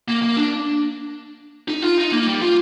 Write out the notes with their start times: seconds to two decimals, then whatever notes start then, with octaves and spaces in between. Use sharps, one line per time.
0.08 A#3
0.22 A#3
0.37 D4
1.68 D#4
1.82 F4
1.98 D#4
2.12 A#3
2.27 G3
2.42 F4